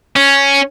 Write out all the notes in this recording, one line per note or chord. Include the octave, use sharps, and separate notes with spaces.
C#4